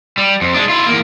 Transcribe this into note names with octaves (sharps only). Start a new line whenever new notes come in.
G3
F2
G#3 D4
E4 F4
E2 A#3